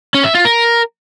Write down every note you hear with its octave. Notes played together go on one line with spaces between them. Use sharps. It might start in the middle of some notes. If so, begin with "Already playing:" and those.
C#4
E5
F4
A#4